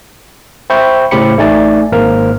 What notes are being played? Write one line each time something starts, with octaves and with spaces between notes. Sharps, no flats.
C5 E5 G5 B5 C#6 G6
A2 C#3 G4 C5 B5 C#7
A1 A3 D#4 D5 G#5 A6
G#1 G#2 A#3 A#4 C5 F6